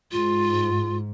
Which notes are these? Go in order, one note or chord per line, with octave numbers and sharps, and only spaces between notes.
G#2 F4